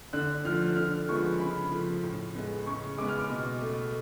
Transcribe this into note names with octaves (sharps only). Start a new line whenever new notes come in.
D3 F#6
F3 A3 F6
D3 F6
F3 G#3 B3 C#6
C#3 B5
F3 A3
A2
G#3 B3
C#3 C#6
G#3 B3 D6
F6
D6
B2
A3